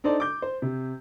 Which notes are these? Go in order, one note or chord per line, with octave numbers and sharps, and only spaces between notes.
D4 D#4 A4 C5 D5
D6 G6
C5
C3